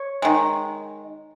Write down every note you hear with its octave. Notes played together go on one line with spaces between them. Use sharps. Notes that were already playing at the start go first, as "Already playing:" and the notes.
Already playing: C#5
D#3 G#3